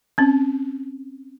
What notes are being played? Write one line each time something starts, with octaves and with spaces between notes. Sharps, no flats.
C4 C#4